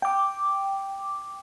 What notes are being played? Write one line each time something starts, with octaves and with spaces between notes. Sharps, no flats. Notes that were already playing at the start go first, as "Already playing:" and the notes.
G5 D6